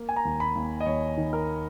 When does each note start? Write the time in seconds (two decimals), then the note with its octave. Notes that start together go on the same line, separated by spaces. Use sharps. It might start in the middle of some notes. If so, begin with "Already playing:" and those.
Already playing: A#3
0.09 G#5
0.16 A#5
0.25 D#2
0.40 B5
0.55 D#2
0.80 D#5
0.86 D#2 C#5
1.17 D#3
1.33 A#4